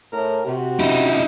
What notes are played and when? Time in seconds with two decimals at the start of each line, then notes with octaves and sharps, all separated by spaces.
0.13 A2 A#4
0.46 C3 F#4
0.80 D#4 E4